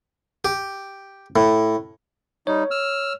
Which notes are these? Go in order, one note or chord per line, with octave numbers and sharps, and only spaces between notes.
G4
A2
G3 D#4 C#5
E6 F6